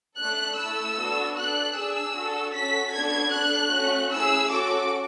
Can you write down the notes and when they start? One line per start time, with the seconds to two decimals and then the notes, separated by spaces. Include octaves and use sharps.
0.18 A3 D4 A4 F#6
0.58 A3 E4 A4 E6
0.98 B3 D4 F#4 A4
1.37 D4 A4 F#6
1.76 D4 G#4 E6
2.16 D4 F#4 A4
2.54 C#4 F#4 A4 B6
2.94 B3 D4 F#4 A4 G#6
3.33 D4 A4 F#6
3.72 A3 C#4 F#4
4.11 C#4 E4 G#4 E6
4.51 C#4 F#4 A4 D6